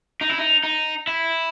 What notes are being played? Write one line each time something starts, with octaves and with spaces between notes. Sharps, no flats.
D#4
E4
D#4
D#4
E4